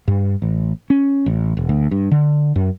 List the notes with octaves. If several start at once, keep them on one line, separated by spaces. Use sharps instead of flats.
G2
A1
C#4
A1
E1
D2
G2
D3
F#2